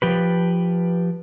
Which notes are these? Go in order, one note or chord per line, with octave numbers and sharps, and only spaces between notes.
F3 G4 B4